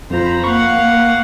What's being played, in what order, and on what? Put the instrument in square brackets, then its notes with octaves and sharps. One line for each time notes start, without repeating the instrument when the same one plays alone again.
[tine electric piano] F2 F4 [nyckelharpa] C5 A#5 [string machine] B5
[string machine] A#3 [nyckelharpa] F5 F#5 [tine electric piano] C#6